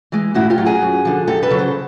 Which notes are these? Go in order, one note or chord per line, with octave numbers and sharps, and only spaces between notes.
E3 G#3
A2 E4 F#4
F4 G4
F#3
F#4 G#4
F#2
D3 F3
F#2 G4 A4
A4 B4
C#3 F#3
C5